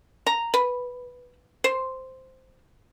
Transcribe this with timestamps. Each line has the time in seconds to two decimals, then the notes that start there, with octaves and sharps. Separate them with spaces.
0.26 A#5
0.54 B4
1.64 C5